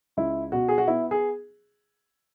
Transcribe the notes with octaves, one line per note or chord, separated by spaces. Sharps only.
C#2 E4
B2 F#4
G#4
F#4
B3 E4
G#4